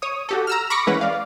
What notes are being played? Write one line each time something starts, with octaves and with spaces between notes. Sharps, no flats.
C#5 D#6
F#4 G4 A4
A#5 E6 F6
B5 C#6 D6 A#6 C#7
E3 G#3 C#4 B4 F#5
D5 F5